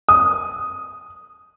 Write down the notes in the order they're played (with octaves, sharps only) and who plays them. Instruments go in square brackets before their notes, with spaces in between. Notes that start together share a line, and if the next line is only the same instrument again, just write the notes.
[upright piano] D#6